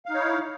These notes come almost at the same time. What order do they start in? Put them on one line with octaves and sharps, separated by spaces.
F5 D#4 C#5 E4